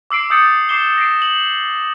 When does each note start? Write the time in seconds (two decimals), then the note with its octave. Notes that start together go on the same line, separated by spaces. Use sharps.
0.11 D6 E6 C7 D7
0.30 D#6 E6 G6 A6 C#7
0.69 D6 C7 E7 G7
0.98 A#6 C7 D7
1.22 F#7